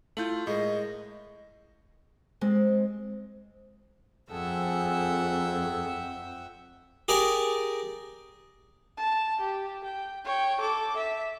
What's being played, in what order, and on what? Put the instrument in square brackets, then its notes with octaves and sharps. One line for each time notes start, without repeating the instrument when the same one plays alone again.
[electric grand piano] A3 F4 G6 [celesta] E4 F#7
[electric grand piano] A2 [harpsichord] G#3 A#4 [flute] D#5
[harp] G#3 [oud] C4
[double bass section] F2 [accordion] G#4 A4 [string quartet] E5 F#5 G5
[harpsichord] G4 G#4 A#4 D5 G#5
[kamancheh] A5
G4
G5
C#5 G5
A4 D6
E5